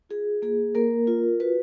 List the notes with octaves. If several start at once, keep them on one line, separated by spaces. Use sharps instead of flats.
F4 G#4
A#3 G#4
A#3 A#4
F4
F#4 B4